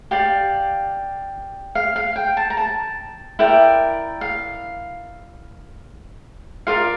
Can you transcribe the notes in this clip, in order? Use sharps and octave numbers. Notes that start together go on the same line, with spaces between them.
G4 D5 F5
F5
F5
G5
A5
A#5
A5
E4 A#4 D5 G5
F5
F4 A#4 D5 F5